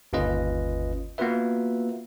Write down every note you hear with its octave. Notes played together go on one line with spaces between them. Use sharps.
G1 D#2 C#4 F4 B4 D#5
A#3 B3 F4 F#4 B4 E5